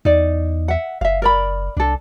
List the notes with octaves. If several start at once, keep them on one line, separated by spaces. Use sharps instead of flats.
E2 D#4 D5
E5 F#5
F#1 E5 F5
A#4 D5 B5
C2 D4 A4